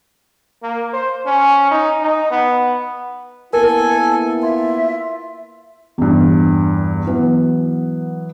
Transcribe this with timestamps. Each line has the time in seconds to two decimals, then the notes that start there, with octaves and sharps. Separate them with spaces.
0.63 A#3
0.94 C5
1.26 C#4
1.71 D#4
2.02 D#4
2.31 B3
3.53 A#3 B3 E4 A4 A#4 G#5
4.42 F4 E5
5.98 E2 G2
7.07 E3 F#3 B3